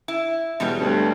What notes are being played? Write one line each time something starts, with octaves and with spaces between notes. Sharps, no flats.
E4
E1 B2 F#3 G3
D2 G2